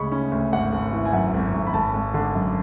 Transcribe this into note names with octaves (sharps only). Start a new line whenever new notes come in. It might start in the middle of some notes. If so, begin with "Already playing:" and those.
Already playing: D2 C#3 G#3 C#4 B5 C#6
C#4
D2
G#1 F#5
G#1
E3
G#5
F#2 F#5
G#1
G#1
B5
G#1 A5
G#1
D3
F#2